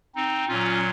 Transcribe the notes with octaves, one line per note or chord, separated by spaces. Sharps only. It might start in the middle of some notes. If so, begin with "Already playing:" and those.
C4 D#4
A#2 F#3 C#4 F4